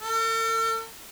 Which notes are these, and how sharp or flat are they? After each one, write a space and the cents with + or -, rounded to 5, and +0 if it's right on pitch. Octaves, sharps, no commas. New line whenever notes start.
A4 +45